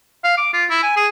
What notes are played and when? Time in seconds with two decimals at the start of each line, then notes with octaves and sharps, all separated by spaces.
0.24 F5
0.38 D6
0.54 F4
0.70 E4
0.83 G#5
0.97 G#4